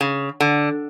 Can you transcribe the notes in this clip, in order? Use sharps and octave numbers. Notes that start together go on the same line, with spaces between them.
C#3
D3